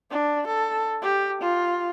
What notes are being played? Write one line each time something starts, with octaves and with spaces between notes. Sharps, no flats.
D4
A4
G4
F4